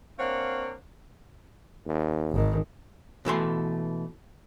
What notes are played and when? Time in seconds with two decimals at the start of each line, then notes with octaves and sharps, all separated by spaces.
0.19 A#3 C4 D4 C#5 F5 F#5
1.86 D#2
2.32 G#1 D#3
3.25 B2 E3 A3 C6